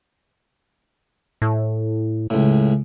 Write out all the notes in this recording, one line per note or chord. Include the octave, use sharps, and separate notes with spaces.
A2
C#2 A2